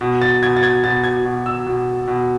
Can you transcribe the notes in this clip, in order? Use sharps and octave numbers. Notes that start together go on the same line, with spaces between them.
B2
A6
B2 G#6
A6
G#6
B2 A6
G#6
B2
E6
B2
B2